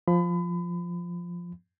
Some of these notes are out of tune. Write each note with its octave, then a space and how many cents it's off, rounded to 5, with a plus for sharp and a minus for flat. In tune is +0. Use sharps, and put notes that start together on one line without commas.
F3 +0 B5 +30